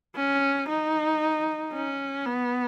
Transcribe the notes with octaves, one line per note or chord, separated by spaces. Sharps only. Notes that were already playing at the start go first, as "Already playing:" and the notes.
C#4
D#4
C#4
B3